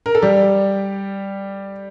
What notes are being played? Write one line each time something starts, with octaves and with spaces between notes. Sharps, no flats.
A#4
A4
G3 G4